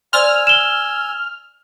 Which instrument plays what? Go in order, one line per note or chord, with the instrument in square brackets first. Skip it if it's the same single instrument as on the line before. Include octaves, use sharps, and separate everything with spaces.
[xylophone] C5 D5 C6 [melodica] G#5 E6 [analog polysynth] F6
[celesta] E7 G7